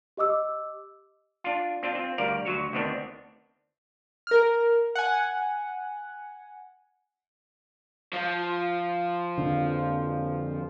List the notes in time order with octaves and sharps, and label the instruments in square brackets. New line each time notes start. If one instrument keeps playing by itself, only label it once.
[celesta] G4 D#5 D6 E6
[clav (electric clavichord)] D4 F4
C4 D4 F4
C4 F4
D2 G3 A#4 D5 F5
D2 F#3 F#4 C#5
D2 D#3 B3 C4 D4
[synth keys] A#4 F6
F#5 G#5
[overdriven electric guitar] F3
[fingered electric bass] F2 D3